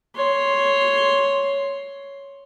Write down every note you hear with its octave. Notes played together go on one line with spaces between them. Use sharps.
C#5 C6